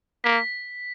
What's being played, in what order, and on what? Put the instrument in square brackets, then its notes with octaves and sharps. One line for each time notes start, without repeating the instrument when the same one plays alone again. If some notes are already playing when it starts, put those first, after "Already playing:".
[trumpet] A#3 [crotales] B6